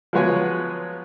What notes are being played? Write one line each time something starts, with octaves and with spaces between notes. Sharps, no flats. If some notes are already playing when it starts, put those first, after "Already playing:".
F3 F#3 G#3 B3 C#5 G#5